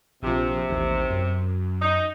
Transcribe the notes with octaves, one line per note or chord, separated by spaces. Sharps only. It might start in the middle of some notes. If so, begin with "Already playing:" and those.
A#1 C3 F3
A1 D#2
F#2
D#4